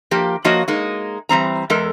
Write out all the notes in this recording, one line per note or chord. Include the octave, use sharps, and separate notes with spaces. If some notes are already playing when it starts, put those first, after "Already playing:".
F3 A#3 G4
F3 A#3 F#4 C#5 D#5
G#3 A#3 D#4
E3 G3 C4 A#5
E2 G#3 A4 A#4